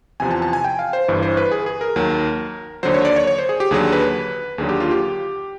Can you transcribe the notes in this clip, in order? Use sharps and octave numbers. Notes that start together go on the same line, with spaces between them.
E2 C3 F3 G#5
A5
A5
G#5
G5
F5
C5
G1 G2 E3
C5
B4
G#4
G#4
A#4
D#2 D#3 F#3
D#2 D3 F#3 C5
C#5
D5
C#5
C#5
C5
G#4
G4
D#2 D3 F#3 G#4
B4
D#2 D3 F#3 G#4
G4
F4
G4